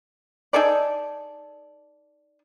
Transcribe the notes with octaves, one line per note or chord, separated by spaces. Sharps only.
D#4 G#4 A4 D5